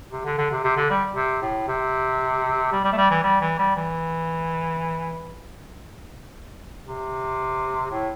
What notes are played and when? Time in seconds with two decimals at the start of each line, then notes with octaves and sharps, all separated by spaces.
0.12 C3
0.25 D3
0.38 D3
0.51 C3
0.64 C3
0.77 D3
0.90 G3
1.16 C3
1.42 A2
1.68 C3
2.72 G3
2.84 G3
2.92 A3
2.98 G3
3.10 E3
3.23 G3
3.41 E3
3.59 G3
3.76 E3
6.87 C3
7.91 A2